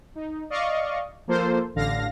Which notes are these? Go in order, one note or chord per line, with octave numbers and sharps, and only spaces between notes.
D#4
D5 D#5 F5 C#6
F3 A#3 F4 A4 C5
A1 D3 F5 A#6